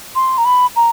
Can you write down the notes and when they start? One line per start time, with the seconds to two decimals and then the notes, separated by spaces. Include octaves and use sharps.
0.15 C6
0.38 A#5
0.45 B5
0.76 A#5